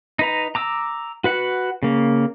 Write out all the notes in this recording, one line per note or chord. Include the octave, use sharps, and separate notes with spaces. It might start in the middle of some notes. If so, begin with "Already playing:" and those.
D#4 B4 A#5
A#5 D6 E6
F#4 B4 F#5
C#3 A#3